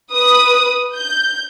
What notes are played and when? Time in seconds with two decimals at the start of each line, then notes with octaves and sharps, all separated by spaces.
0.13 B4 D#6
0.94 G6